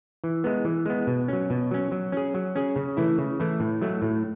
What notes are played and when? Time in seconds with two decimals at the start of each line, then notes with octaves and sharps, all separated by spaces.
0.24 E3
0.44 G#3 B3
0.65 E3
0.86 G#3 B3
1.07 B2
1.28 F#3 C#4
1.50 B2
1.71 F#3 C#4
1.92 F#3
2.12 C#4 G#4
2.34 F#3
2.55 C#4 G#4
2.76 C#3
2.97 E3 A3 E4
3.18 C#3
3.40 E3 A3 E4
3.60 A2
3.81 F#3 A3
4.02 A2